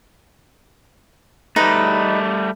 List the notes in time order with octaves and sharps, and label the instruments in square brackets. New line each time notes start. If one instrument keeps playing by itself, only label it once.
[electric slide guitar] G3 A3 [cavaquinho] D#4 B4 D#5